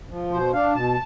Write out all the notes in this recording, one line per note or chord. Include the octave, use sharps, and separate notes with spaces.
F3
B2 C5
D4 F5
B2 A5